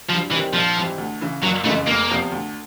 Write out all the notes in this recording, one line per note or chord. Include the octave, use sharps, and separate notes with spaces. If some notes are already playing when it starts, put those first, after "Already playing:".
G2 F3
D#3 E3 G3 C4
A#1 F3
G#2 E3 G3 C4
D2
C#3 E3
F#1 F#3
F2 C#3 E3 G#3 A3
F1 A#3
E2 C3 F3
D2